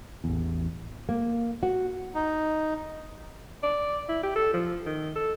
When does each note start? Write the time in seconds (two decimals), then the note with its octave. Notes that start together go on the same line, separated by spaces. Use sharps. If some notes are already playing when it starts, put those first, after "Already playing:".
0.24 A1 E2
1.09 A#3
1.63 F#4
2.15 D#4
3.63 D5
4.09 E4
4.23 G4
4.36 A4
4.54 F3
4.86 D#3
5.16 A4